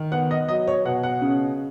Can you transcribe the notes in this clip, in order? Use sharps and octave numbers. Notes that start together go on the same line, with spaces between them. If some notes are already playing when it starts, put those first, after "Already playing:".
Already playing: D#3
B3 F#5
D#5
F#3 D#5
C#5
B2 F#5
F#5
C#3